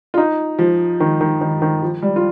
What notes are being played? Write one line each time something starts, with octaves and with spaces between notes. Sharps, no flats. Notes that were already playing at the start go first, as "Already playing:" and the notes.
F4
D#4
F3
D#3
D#3
D#3
D#3
F3
G3
F4